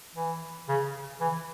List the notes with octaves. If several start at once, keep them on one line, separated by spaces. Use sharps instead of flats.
E3
C#3
E3